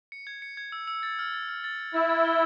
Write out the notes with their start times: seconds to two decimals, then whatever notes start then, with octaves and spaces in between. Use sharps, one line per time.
0.12 C#7
0.27 G#6
0.42 C#7
0.57 G#6
0.72 E6
0.88 E6
1.03 A6
1.19 F6
1.34 A6
1.49 F6
1.64 A6
1.79 A6
1.94 E4 A6
2.10 A6
2.25 G7